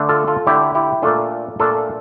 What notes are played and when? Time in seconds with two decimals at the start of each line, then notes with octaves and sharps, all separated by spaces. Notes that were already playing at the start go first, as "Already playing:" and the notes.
Already playing: D3 A3 D4
0.09 F4 A4
0.27 F4 A4
0.47 D3 A3 D4 E4 G4
0.75 E4 G4
1.02 A#2 A3 D4 F4 A4
1.60 A#2 A3 D4 F4 A4